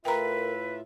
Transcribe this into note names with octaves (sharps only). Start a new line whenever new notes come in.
A2 F4 A#4 B4 E5 G5 A#5